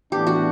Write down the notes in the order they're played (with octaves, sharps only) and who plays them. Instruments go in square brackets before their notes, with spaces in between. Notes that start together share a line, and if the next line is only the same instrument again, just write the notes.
[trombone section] A2 E3 B3 D4 [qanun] G4
[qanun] F#4